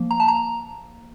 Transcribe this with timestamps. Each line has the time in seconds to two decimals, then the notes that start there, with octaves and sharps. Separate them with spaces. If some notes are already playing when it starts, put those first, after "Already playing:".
Already playing: F3 A#3
0.11 A#5
0.20 A5
0.28 A#5